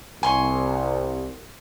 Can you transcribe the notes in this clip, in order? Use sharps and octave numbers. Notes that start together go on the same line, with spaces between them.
C2 G#5 C6 C#6